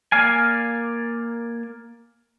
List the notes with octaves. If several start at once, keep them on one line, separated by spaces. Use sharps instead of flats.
A#3 D5 F5 G#5